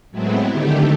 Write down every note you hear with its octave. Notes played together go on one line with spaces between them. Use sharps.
A2 F#3 G#3 B3 C4 E4
D3 D#3 A3 G4